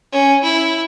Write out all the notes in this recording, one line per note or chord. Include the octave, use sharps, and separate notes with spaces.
C#4
E4